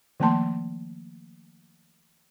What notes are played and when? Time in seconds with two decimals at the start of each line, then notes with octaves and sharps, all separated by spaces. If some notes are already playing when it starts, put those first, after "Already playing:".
0.20 D#3 F3 A3 A#3 A5 C6